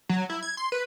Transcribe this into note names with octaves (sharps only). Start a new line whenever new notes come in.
F#3
E4
G#6
C6
B4